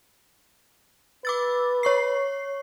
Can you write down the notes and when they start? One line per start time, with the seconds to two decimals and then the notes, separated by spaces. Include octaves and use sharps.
1.25 B4 D6 E6 A6
1.83 C#5 C#6 C7